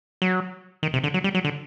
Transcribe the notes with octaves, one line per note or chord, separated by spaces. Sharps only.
F#3
D#3
C3
D3
F#3
G3
F#3
D3